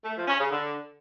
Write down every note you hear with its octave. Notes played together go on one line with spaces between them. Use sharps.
A3
F3
C#4
C#3
D3